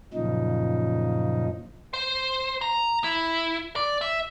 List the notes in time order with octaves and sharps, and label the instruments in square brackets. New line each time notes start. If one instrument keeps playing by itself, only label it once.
[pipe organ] F#2 A#2 C#3 F3 D#4
[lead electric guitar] C5
A#5
E4
D5
E5